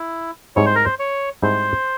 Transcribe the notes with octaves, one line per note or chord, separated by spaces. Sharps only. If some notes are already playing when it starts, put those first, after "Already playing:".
Already playing: E4
G#2 G3 C4 E4 C#5
C5
A#4
C5
C#5
G#2 G3 C4 E4 C5